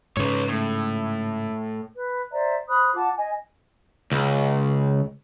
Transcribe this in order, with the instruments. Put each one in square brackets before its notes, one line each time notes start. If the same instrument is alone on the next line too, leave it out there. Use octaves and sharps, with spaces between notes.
[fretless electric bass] G#2 C#3 [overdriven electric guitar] B4 C#5
[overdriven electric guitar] A2
[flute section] B4
C5 D5 E5 A#5
C5 B5 D#6 F#6
F4 F#5 A5 D6
D#5 G#5
[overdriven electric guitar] C#2